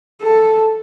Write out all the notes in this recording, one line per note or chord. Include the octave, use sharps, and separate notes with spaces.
A4